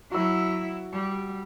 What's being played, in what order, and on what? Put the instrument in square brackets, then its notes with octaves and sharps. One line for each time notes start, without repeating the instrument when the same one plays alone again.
[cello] F#3 E4 [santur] F#4 E6
[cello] G3